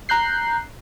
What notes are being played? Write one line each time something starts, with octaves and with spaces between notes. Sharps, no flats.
A#5 F#6 G6 C7